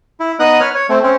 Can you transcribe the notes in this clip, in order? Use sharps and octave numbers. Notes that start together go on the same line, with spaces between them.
E4
B3 D#4 D#5 D#6 F#6
B4 C#5 F6
C#5
A3 C4
C4 C#4